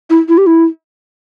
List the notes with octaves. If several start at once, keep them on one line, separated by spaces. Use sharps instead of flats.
E4
E4
G4
E4